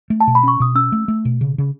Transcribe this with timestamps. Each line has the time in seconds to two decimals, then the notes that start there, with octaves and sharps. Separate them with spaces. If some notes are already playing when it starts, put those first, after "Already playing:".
0.10 A3
0.20 A5
0.27 B2
0.35 B5
0.43 C#4 C#6
0.60 B2 D#6
0.75 C#4 E6
0.92 A3
1.08 A3
1.25 B2
1.41 C#3
1.58 C#3